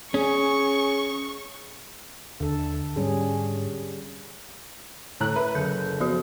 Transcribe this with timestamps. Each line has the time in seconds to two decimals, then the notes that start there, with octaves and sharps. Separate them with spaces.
0.14 C#4 G#4 C#6
2.40 D#2 D3 A4
2.96 G#2 G3 C#4 G#4
5.20 A2 A#5 F#6
5.36 B4 E5
5.55 F#1 A4 G6
6.00 F3 F#4